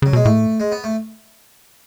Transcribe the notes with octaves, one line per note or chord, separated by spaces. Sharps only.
C#3 F#3
B2 G#3
A2 A3
G#3
B3
A3